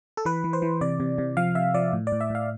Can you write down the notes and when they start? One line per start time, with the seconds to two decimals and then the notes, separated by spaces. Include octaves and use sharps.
0.17 A4
0.25 E3 B4
0.44 E3
0.53 C5
0.62 E3
0.81 C3 D5
1.00 C3
1.18 C3
1.37 F3 F5
1.55 C3 E5
1.74 F3 D5
1.93 A2
2.07 D5
2.12 A2
2.21 E5
2.30 A2 F5